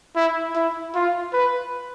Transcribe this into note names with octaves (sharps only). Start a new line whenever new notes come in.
E4
E4
F4
B4